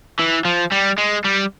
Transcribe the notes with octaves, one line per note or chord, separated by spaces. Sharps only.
E3
F3
G3
G#3
G3